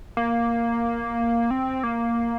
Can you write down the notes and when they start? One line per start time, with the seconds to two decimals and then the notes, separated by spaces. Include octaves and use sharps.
0.17 A#3
1.51 C4
1.83 A#3